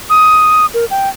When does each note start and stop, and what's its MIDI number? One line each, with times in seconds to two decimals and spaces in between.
0.10 0.66 87
0.74 0.85 70
0.91 1.09 79